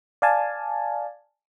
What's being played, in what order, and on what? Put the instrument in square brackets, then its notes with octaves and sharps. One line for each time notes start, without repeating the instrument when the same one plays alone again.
[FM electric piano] D5 F5 G#5 A5